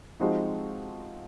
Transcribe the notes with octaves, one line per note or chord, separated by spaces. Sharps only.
F3 G#3 C4 D#4 F#4